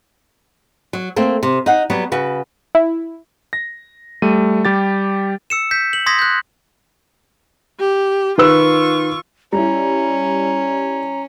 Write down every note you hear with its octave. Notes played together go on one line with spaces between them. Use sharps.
F#3
A3 A#3 C4
C3
D#4 F#5
F#3 G3 B3
C#3 F#4 B4
E4
A#6
G3 A3 D#7
G3 G4 A6
E6 C#7 E7
G6 B6
F#7
C6 D#6 G#6 A#6 B6
F#6 G6
G4
D#3 F4 B4 C#6 E6
G3 C#4 E4 A#5